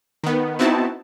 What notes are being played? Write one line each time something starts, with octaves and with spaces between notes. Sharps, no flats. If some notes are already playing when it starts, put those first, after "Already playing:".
D#3 B3
B3 C4 D#4 E4 F#4 A5